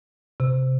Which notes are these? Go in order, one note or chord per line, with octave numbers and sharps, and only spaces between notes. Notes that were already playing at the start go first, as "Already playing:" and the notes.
C3